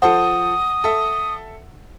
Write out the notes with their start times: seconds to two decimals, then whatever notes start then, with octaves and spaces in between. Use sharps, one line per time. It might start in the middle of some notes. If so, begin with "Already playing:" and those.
0.02 F3 A4 C5 F#5 D#6
0.84 A4 E5